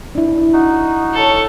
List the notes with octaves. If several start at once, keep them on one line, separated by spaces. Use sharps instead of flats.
D4 E4
D#4 F#4
A4 C#5